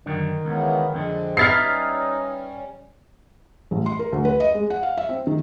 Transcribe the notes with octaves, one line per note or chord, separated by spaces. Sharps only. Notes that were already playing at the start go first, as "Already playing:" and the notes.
F#2 D3 D#3
C#2 C#3 E3 B3
F2 D3 G#3 C4 D4
D#4 B4 E5 F6 A6 C7
G3 C#4
A1
C6
A#4
D2
B4
D#5
G#3
F#5
F5
E5
C4
D#3